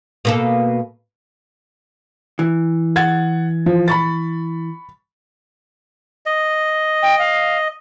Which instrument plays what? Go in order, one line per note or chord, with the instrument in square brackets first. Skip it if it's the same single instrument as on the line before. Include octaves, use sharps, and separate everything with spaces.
[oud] B2 A#3 A4
[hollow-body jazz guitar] E3
[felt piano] F#5 G#6 A6
F3
B5 C#6 A6
[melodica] D#5
[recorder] G5
F5